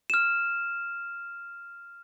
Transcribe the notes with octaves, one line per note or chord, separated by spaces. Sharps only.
F6 E7